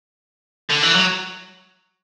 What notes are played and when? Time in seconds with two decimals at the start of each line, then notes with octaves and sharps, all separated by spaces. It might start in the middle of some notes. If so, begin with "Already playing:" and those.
0.70 D3
0.82 E3
0.95 F#3